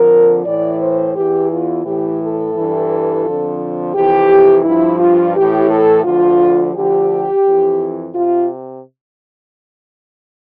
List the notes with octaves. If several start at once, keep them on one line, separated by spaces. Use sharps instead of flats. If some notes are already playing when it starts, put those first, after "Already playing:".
Already playing: F2 D3 F3 A#4
A2 E3 D5
C5
E2 E3 G4
F4
A2 E3 G4
A4
G2 E3
F2 D3 F3
F2 C3 E3 G4
G2 F3 E4
F4
A2 E3 G4
A4
D2 D3 F3 F4
D2 D3 F3 G4
F2 E3
C3 F4